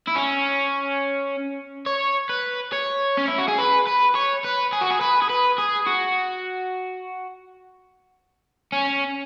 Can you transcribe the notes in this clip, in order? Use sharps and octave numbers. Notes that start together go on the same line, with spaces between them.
E4
C#4
C#5
B4
C#5
C#4
E4
F#4
G#4
B4
B4
C#5
B4
G#4
F#4
G#4
B4
G#4
B4
G#4
F#4
C#4